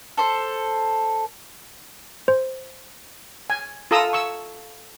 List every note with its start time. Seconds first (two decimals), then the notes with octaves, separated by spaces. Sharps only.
0.17 A4 C5
2.28 C5
3.50 G#5
3.91 F4 A4 A#5 D#6 E6
4.13 C#6 E6